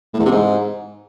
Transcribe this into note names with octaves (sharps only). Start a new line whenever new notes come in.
A2
E2
C3
G#2